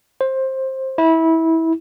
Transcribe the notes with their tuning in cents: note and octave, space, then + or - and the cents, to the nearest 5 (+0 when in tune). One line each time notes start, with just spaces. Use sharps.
C5 +15
E4 -20